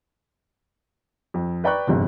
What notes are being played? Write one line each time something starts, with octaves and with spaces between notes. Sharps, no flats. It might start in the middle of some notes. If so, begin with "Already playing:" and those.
F2
B4 D5 G5 A#5 C#6 F#6
G1 F2 G#2 C3